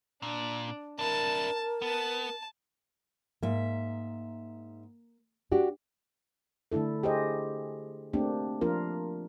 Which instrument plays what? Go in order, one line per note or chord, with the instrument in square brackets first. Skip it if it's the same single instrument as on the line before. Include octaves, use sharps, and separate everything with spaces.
[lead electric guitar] A#2 [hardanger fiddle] D4
[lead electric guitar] D4 E4 [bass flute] A#4 [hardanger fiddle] A5
[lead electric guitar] B3 [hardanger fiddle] A5
[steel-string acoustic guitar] G#2 E5 [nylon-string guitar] A#3
[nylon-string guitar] D4 F#4 G4
[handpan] D3 A3 D4 E4 A4
G4 G#4 C5 D#5
A3 A#3 C4 D4 G4
F3 A#3 D4 F4 A#4